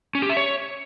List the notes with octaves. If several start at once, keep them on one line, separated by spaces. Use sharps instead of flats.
C#4
G4
E5
C#5